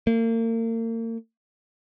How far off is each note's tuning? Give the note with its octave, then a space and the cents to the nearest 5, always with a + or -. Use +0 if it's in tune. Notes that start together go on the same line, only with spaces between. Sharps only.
A#3 -40